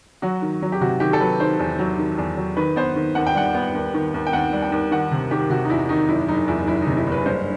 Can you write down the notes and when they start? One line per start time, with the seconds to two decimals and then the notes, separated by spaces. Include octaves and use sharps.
0.22 F#3 F#4
0.42 D#3
0.62 F#3
0.72 G4
0.81 C3 F#4
1.00 D#3 G4
1.13 A4
1.20 F#3 B4
1.40 D#3 C5
1.59 E2
1.79 F#3
1.98 D#3
2.18 E2
2.37 F#3
2.57 D#3 B4
2.76 B3 C5
2.96 D#3
3.15 D#2 F#5
3.27 G5
3.35 G3 F#5
3.55 B3
3.75 D#2
3.94 D#3
4.14 D#2
4.27 G5
4.33 D#2 F#5
4.53 G3
4.62 G5
4.72 D#2
4.91 D#3 F#5
5.12 C3
5.31 D#3 G4
5.50 C3 F#4
5.65 D#4
5.70 E2 E4
5.89 D#3 D#4
6.08 F#1 E4
6.28 F#1 D#4
6.48 E2 E4
6.67 F#1 E4
6.82 C3 D#4
6.97 E4
7.06 F#1
7.12 B4
7.26 G2 C5